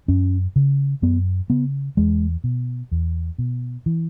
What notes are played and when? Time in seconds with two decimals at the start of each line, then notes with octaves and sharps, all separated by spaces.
0.08 F#2 C#4
0.56 C#3
1.02 F#2 B3
1.50 C#3 B3
1.97 E2 G#3
2.44 B2
2.92 E2
3.38 B2
3.86 E3